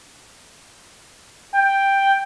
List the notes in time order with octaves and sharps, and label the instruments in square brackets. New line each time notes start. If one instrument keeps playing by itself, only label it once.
[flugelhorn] G5